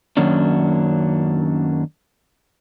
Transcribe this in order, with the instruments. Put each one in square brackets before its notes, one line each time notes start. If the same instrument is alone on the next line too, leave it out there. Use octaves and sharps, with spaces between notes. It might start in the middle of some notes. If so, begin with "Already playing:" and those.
[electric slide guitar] F#2 D#3 F#3 A#3 C#4 D4